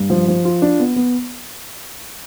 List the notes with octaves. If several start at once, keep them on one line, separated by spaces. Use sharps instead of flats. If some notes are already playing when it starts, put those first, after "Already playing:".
Already playing: G2
F3
F3
F4
D4
B3
B3